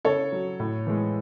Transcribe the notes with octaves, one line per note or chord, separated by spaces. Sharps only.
C#3 A4 C#5
F#3
A2
E3 G#3